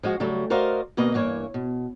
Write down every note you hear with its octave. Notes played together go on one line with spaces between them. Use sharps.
F3 G#3 F#4
C#3 F#3 G3 A3
F#4 A#4 C5 D5 D#5 F5
D2 B2 A#3 B4 D#5
G2 E3 A#3 C#5
B2